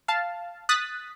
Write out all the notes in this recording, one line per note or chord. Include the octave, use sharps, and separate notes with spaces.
F5 A5
D#6 F#6 A6 B6